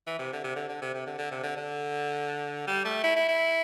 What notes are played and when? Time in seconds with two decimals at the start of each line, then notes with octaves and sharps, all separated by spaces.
0.07 E3
0.19 C3
0.33 D3
0.44 C3
0.56 D3
0.69 D3
0.82 C3
0.94 C3
1.06 D3
1.18 D3
1.31 C3
1.43 D3
1.56 D3
2.67 G3
2.85 A3
3.04 E4
3.16 E4
3.29 E4